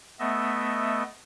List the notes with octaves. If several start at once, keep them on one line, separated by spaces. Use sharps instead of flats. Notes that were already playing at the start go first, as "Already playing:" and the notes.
A3 B3 D#5 E5